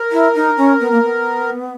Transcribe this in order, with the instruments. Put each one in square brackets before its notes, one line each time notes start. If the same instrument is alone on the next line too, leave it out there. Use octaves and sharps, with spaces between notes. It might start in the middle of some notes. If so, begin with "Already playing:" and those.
Already playing: [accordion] A#4
[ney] E4
D#4
C#4
B3
A#3
B3